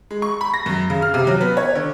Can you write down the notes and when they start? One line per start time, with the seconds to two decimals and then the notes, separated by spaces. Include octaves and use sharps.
0.11 G#3
0.22 C#6
0.41 B5
0.54 A#6
0.66 F#2
0.90 C#3
1.02 F6
1.14 C3
1.27 F#3
1.41 B3
1.57 C#5
1.75 D3